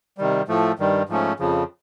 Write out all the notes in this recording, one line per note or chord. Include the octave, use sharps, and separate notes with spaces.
C3 D#3 G3
A2 F3 A3
G2 D#3 G3
G#2 F3 A3 C#4
F2 C#3 F3